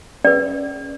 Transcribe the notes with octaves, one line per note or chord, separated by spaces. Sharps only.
C#4 G#4 B4 D5